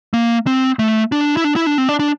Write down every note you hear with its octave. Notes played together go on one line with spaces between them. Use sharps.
A#3
C4
A3
D4
E4
D4
E4
D4
C4
D4
D4